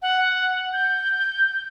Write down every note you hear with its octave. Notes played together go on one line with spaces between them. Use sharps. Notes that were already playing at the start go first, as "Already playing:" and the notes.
F#5
G6